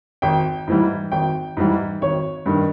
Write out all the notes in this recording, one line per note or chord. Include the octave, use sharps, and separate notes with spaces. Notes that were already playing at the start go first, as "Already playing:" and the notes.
G#1 G5
G#2 E3 G3
G#1 G5
G#2 E3 G3
G#1 C#5
G2 D#3